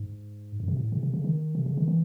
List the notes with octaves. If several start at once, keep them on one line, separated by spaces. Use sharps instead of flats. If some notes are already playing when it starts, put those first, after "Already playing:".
Already playing: G#2
F#2
C3
A2
C3
C3
C#3
D#3
C3
C#3
D#3
E3